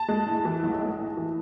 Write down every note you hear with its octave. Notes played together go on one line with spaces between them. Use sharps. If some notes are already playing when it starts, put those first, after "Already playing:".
Already playing: A5
G#3
A2
E3
B1
G#3
A2
E3